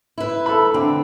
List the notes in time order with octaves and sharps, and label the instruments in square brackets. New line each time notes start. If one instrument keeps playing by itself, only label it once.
[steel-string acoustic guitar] E4 B4
[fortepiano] A4 B5
[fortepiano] D3 [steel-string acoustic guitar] C4